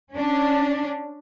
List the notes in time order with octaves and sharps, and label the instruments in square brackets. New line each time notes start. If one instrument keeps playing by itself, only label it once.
[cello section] C#4 D4